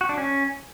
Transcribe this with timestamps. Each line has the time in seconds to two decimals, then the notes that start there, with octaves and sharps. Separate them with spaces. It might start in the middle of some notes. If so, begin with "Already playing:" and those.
0.01 F#4
0.09 D4
0.18 C#4